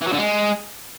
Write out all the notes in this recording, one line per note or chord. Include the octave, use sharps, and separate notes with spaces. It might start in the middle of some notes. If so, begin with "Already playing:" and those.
E3
F#3
D3
G#3